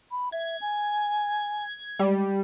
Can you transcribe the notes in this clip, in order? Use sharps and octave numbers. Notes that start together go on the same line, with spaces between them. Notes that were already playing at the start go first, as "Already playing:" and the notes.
B5
E5 G#6
G#5
G3 G#3